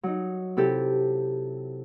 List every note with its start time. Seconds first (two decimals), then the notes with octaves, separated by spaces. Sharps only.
0.03 F#3 D#4
0.57 C3 E4 G4 A4